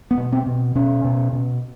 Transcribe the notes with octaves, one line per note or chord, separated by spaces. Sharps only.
B3
B2
C4
B2
B2 C#4
B2
B2